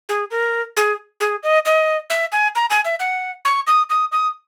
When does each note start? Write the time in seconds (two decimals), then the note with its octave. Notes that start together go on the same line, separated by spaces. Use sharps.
0.09 G#4
0.31 A#4
0.77 G#4
1.20 G#4
1.43 D#5
1.66 D#5
2.10 E5
2.32 G#5
2.56 A#5
2.70 G#5
2.85 E5
3.00 F#5
3.45 C#6
3.67 D#6
3.90 D#6
4.12 D#6